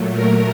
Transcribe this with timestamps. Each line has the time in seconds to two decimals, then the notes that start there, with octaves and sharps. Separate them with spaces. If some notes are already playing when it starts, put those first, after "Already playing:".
Already playing: A#2 F#3 A3
0.13 A#4